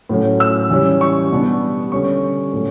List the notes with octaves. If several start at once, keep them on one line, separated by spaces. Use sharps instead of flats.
A2 F#3 C#4
E6
E3 G3 C#4
C#6
B2 G3 B3 D4
D3 G3 C#4 C#6
A2 F#3 C#4